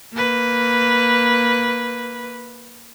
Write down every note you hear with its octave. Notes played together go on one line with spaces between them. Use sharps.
A#3 B4